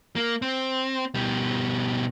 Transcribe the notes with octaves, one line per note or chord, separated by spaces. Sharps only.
A#3
C4
B2 G3